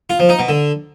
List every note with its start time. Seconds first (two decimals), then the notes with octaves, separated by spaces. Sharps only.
0.10 F4
0.19 F3
0.29 D#4
0.39 B2
0.48 D3